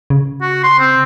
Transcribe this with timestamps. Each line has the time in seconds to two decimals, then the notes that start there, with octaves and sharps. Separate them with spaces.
0.10 C#3
0.42 F#4
0.64 C6
0.79 C4